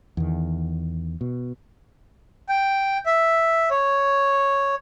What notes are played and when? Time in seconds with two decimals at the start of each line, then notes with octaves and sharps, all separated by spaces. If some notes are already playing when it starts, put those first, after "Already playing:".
0.17 E2 D#3
1.21 B2
2.49 G5
3.06 E5
3.71 C#5